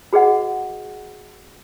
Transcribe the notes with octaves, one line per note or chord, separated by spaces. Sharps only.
F#4 G#4 B4 D#5 F#5